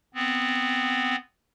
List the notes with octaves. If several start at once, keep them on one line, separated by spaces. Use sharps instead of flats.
B3 C4